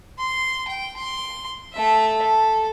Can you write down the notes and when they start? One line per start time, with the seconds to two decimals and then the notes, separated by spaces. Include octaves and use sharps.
0.19 C6
0.68 G5
0.96 C6
1.73 A3 E5
2.22 A4